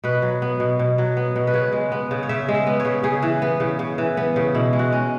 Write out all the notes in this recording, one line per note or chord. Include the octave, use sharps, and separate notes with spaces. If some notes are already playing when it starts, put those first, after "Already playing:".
B2 B4
F#3
B3
B2
B2
F#3
B3
B2
B4
C#3 C#5
G#3
B3
C#3
C#5
C#3 E5
G#3
E5
B3
C#5
C#3
C#3 G#4
E3
B3
C#3
C#3
E3
B3
C#3
B2 E4
G#3
F#4
C#4